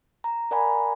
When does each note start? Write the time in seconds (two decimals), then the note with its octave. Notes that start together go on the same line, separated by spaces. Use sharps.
0.24 A#5
0.51 A#4 D5 F#5 G#5 A#5 B5